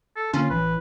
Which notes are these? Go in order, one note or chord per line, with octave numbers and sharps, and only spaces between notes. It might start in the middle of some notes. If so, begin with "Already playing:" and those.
A4
D3 A#3 C#4 F4
A1 E3 B4